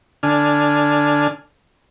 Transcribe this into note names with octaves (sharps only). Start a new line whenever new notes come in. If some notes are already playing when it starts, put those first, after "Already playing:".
D3 D4 G#5 F6